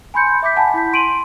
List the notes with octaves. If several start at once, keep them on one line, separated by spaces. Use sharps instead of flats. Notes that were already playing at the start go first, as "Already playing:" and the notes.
G#5 B5 C6 G6 C#7
E5 D6 G6 B6
F#5 G#5 A5 B5
E4 G6 B6
C6 D7 D#7 F#7